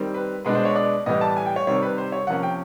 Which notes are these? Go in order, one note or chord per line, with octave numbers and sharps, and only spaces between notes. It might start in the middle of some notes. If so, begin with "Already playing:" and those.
Already playing: D#3 G3 C4
B4
B2 G#3 B3 D4 B4
C5
C#5
D5
A2 E3 G3 B3 D#5
A5
G#5
G5
C#5
C3 D#3 G3 C4 C#5
B4
C5
C#5
C3 F3 A#3 C#4 F#5
G5